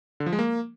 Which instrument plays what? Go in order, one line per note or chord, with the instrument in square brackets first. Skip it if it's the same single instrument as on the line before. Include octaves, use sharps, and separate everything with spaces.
[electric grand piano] D3
F3
G#3
A#3